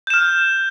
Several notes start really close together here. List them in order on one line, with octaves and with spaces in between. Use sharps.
G6 E7 F6